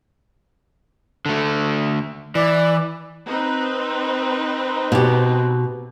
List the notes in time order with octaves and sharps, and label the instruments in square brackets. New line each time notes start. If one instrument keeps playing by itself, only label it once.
[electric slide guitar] D3 A3
[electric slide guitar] E3 [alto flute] D5
[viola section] C4 D#4 B4
[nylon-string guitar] B2 G4